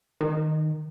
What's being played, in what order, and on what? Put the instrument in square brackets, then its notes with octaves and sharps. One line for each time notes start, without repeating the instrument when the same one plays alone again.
[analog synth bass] D#3